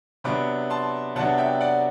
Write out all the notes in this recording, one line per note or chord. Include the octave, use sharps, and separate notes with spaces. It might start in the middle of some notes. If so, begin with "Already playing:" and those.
C3 F#3 B3 D4 B5 D6
A5 C6
C3 F#3 B3 D4 F#5 A5
E5 G5
D5 F#5